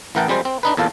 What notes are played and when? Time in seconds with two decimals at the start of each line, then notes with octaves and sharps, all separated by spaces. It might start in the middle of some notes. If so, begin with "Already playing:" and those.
0.15 A1 E3 A#4 F#5 G5 A5
0.28 F2 G3 G#3 C5
0.45 C4
0.63 D4 D#4 B4
0.77 E2 A#2 A4 F5 A5